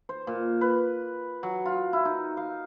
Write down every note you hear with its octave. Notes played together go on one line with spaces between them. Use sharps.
C5
A#2
B4
F#3
F4
E4
D#4
F5